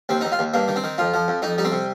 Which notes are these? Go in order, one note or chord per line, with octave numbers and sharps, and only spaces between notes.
D#2 C4
D#2 D#4
F4
D#2
G2 A#3
D#3
C4
D#3
F2 F4
F3
F2
F2 D#4
G3 D#4
C4
C3